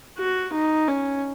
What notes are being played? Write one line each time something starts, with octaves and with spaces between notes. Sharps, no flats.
F#4
D#4
C#4